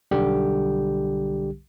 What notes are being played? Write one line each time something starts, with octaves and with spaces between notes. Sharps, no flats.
B1 D3 G3 G4